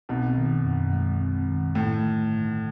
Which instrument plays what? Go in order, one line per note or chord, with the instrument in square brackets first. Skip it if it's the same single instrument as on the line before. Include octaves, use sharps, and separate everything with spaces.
[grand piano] B1 B2 [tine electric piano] C4
[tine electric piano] D#3
F#2
G#3
C4
D#3
[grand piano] A2 [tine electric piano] A3
[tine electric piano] D3
G2